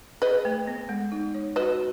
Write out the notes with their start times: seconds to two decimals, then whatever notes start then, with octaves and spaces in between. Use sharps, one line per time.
0.22 G#4 B4 D#5
0.45 A3
0.67 B3
0.89 G#3
1.12 D#4
1.34 C#5
1.56 F#4 B4 D#5